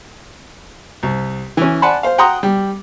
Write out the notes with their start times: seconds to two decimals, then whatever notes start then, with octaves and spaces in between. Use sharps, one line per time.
1.03 C2
1.57 E3 C#4
1.82 D5 F#5 G#5 A5 B5 C6
2.03 C5 F5
2.18 F#5 G5 A#5 C6 D#6
2.43 G3